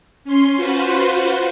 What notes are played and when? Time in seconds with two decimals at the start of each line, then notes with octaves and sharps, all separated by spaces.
0.24 C#4 C6
0.56 F4 F#4 B4 C5